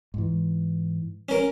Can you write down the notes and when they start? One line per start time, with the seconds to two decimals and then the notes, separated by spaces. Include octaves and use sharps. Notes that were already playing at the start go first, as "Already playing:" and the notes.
0.14 G#2 E3
1.29 C#4 A#4